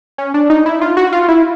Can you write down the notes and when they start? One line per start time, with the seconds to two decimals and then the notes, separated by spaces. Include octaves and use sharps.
0.18 C#4
0.34 D4
0.50 D#4
0.66 E4
0.81 F4
0.97 F#4
1.12 F4
1.28 E4